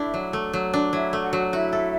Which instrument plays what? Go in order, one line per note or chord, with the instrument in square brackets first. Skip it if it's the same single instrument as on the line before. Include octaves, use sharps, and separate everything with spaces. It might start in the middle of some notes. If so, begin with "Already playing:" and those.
Already playing: [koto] A3 D4 [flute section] E4 E5
[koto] F#3
A3
F#3
D4
[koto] F#3 [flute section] E4 E5
[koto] A3
[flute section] F#4 F#5
[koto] F#3
[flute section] E4 E5 [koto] F#4
[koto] A4